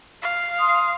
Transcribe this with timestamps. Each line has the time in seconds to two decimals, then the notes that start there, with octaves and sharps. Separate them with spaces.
0.22 F5
0.59 C6 D#6